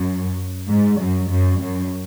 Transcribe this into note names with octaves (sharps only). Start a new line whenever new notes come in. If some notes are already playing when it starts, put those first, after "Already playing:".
Already playing: F#2
G#2
F#2
F#2
F#2